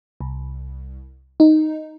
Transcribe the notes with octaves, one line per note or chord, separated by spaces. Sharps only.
C2
D#4